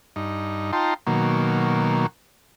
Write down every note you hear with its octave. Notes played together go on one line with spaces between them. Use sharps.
G2 D#4
D#4 F4 G5 A5 A#5 C6
B2 D#3 F#3 A#3